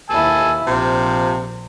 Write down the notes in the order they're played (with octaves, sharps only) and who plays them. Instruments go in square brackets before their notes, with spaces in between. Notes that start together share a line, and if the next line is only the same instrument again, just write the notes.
[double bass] D#2 E4 [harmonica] G#5 A5 E6
[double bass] A#1 [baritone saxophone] C3 [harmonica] F3